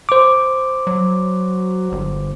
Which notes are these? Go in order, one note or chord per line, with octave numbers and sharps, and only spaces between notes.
C5 D6
F#3
G1